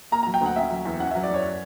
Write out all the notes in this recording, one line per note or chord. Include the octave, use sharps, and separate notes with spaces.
A#3 A#5
F#3 A#5
G5
D2 F#5
C#4 E5
F#3
E2
C#4 F#5
F#3 E5
D5
F#2 C#5